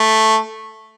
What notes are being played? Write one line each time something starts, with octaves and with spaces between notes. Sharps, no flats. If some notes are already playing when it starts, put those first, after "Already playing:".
Already playing: A3